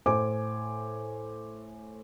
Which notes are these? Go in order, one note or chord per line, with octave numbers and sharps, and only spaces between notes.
A2 C5 G#5 D6